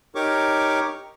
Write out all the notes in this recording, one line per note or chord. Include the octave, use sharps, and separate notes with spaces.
D#4 G4 A#4 C#5 C#6 D6